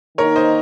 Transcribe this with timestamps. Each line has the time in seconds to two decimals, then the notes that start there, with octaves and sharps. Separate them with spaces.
0.18 D#3 A#3 D#4 A#4 C#5
0.36 C5 D#5